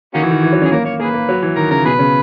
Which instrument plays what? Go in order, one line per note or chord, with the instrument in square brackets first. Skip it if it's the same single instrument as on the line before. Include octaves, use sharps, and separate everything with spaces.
[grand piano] D#3 [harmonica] A#3 C#4 F#4
[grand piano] E3
D#3
E3
F#3
C#4
[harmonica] G#4
[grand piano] A#3 [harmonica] A#4
[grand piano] A#3 [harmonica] C#5
[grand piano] A#3 [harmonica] G#4 B4
[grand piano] A#3
F#3
E3
[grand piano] D#3 [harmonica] A#4
[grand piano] C#3 [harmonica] A#4
[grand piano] B2 [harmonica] G#4 B4
[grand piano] C#3